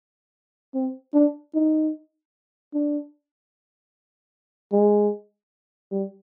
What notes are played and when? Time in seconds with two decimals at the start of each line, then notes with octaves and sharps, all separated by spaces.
0.74 C4
1.14 D4
1.54 D#4
2.74 D4
4.73 G#3
5.92 G3